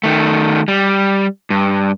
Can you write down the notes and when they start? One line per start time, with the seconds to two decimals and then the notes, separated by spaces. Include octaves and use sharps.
0.04 D#3 A3
0.68 G3
1.50 G2